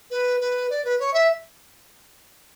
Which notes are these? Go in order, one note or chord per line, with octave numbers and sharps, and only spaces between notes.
B4
B4
D5
B4
C#5
E5